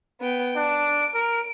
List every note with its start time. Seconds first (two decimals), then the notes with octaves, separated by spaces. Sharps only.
0.21 B3 G5
0.56 D4 D7
1.14 A#4